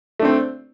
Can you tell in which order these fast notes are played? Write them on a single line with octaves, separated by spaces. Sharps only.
A3 D4 C4